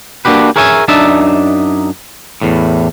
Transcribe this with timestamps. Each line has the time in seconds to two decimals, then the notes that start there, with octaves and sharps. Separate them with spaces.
0.25 A#3 D4 F#4 G4 B4
0.56 G#4 A#4 C#5 E5 F#5 G#5
0.88 F#2 D4 D#4 E5 A5
2.42 E2 A2